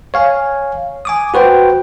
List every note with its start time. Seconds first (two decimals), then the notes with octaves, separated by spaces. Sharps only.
0.14 C#5 F5 G#5
1.05 G#5 D6 D#6
1.34 F#4 B4 C5 G5